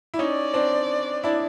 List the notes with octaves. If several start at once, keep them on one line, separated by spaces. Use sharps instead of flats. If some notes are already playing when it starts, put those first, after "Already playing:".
E4
C#4 D#4 D5
C4 D4
D4 E4